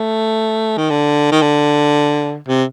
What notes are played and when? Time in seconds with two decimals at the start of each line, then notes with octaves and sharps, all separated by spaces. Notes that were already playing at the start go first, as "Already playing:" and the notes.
Already playing: A3
0.77 D#3
0.90 D3
1.32 D#3
1.42 D3
2.48 C3